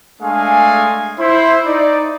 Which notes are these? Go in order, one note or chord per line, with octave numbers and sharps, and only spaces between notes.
G#3 A3 D4 G#4 F5 G#5
E4 C5 E5
D#4 D5